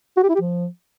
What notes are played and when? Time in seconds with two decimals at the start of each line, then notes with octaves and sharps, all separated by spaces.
0.17 F#4
0.23 G4
0.29 E4
0.35 G4
0.41 F3